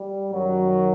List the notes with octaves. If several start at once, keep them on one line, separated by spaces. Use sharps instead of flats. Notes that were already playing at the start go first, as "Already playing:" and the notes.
Already playing: G3
F#2 D#3 F#3